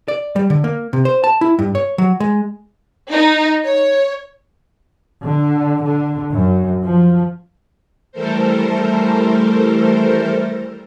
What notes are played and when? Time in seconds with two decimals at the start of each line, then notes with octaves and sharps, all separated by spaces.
0.08 D5
0.36 G3
0.50 D3
0.64 A#3
0.93 C3
1.05 C5
1.24 A5
1.41 E4
1.59 G2
1.75 C#5
1.98 F#3
2.20 G#3
3.11 D#4
3.64 C#5
5.23 D3
5.83 D3
6.31 F#2
6.84 F3
8.12 E3 G3 A3 A4 A#4 C5